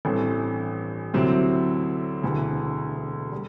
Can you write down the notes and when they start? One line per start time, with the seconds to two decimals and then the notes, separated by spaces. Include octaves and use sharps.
0.05 A1 G2 E3 A3 C4
1.14 D2 C3 F#3 C4 E4
2.23 E1 D2 C3 E3
3.32 G3